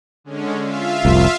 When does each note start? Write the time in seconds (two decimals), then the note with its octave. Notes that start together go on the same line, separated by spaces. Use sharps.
0.24 D3 G#3 C#4
0.60 F4 E5 F5
1.05 F1 C2